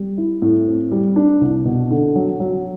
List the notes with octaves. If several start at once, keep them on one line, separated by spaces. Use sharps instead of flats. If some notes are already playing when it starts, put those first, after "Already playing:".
Already playing: G3
E4
A2
C4
G3
D4
C2
B2
D3
F#3
F#3